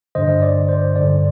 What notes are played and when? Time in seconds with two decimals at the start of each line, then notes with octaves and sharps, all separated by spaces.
0.15 G2 D3 C5 D#5
0.42 D5
0.69 C5
0.96 G2 D3 D5